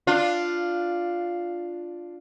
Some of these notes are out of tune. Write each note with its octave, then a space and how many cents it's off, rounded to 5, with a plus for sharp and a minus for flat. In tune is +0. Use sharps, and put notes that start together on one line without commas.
D4 +0 F4 +0